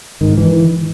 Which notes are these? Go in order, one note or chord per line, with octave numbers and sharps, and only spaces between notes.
G#2 D#3
E3